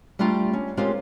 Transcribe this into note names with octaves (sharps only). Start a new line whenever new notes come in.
G3 A3 D4 F4 G5 A#5
C#4
G#3 A#3 C4 C#4 F4 G4